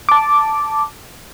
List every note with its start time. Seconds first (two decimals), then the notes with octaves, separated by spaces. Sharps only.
0.09 A5 D6